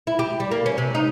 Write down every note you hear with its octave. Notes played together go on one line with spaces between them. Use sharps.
E4
G4
G3
A#3
C#4
C3
D#4